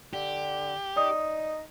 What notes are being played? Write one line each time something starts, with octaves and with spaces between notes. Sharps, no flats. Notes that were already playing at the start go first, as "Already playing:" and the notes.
D3 G4
D#4 D5 D#6